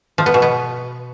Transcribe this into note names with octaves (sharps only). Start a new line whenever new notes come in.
F3
B3
B2
B3